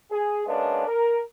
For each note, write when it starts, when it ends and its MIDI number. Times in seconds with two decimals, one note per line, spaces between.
0.11 0.42 68
0.46 0.85 56
0.46 0.85 58
0.46 0.85 59
0.46 0.85 61
0.46 0.85 62
0.87 1.20 70